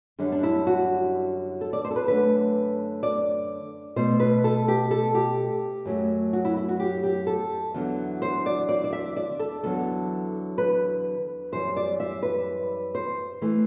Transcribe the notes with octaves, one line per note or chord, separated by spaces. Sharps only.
F#2 D3 G3 D4
D4
E4
F#4
A4
D5
C5
A4
B4
F#2 D3 A3 B4
D5
B2 A3 C5
B4
A4
G4
A4
G4
F#2 F#3 A3
F#4
E4
E4
F#4
G4
G4
A4
E2 D3 F#3
C5
D5
D5
D5
E5
D5
A4
E2 D3 F#3 A4
B4
F#2 E3 G3 C5
D5
E5
B4
C5
E3 A3